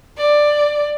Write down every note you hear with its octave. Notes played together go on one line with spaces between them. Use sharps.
D5